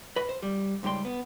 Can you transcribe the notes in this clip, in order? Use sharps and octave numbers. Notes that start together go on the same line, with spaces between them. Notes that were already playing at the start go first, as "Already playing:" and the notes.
B4 D#5
C5
G3
C#2 G#2 G3 G5 C6
B3